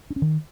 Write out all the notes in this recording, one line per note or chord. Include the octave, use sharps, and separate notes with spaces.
D4
C#4
D#3